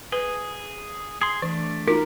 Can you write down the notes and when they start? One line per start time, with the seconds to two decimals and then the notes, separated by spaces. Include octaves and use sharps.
0.12 G#4 B4
1.21 G#4 C6
1.42 E3 A3 D4 D5
1.88 D#4 F4 F#4 A#4